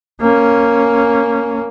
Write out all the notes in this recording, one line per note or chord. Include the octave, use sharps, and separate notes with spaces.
A#3 C#4